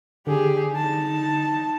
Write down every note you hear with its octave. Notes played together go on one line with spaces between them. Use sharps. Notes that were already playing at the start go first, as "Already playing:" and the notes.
D3 G4 G#4
D#4 A5